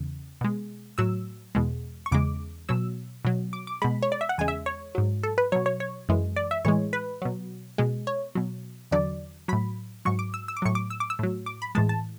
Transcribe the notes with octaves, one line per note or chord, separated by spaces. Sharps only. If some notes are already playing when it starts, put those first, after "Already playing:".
Already playing: E2 C#3
B2 G#3
A2 F#3 E6
E2 B2 G#3
C#6
E2 C#3 G#3 D6
B2 F#3 E6
B2 F#3
D6
D6
B2 G#3 B5
C#5
D5
E5
F#5
E2 C#3 G#3 G#5
E5
C#5
G#2 F#3
A4
B4
B2 F#3 C#5
C#5
C#5
F#2 E3 G#3
D5
E5
A2 E3 G#3 C#5
B4
B2 F#3
B2 G#3
C#5
B2 F#3
E2 D3 F#3 D5
A2 F#3 B5
G#2 F#3 C#6
D6
E6
E6
D6
A2 F#3 C#6
D6
E6
D6
E6
A2 F#3
D6
B5
A2 E3 G#3 A5
A5